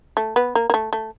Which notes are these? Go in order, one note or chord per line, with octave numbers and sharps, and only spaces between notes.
A3
B3
A#3
A#3
A3
A3